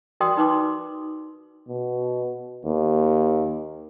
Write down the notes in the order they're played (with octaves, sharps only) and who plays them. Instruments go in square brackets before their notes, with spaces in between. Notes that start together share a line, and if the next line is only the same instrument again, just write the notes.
[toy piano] F#4 A#4 D5 G5 C6 D#6
D#4 B4 C6 D6
[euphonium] B2
D#2